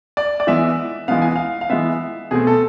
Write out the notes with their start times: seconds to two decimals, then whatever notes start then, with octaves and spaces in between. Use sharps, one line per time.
0.17 D5
0.40 D5
0.47 E3 G#3 B3 E5
1.08 E3 G#3 B3 F5
1.22 G#5
1.36 F5
1.61 F5
1.70 E3 G#3 B3 E5
2.31 B2 A3 C4 G#4
2.47 A4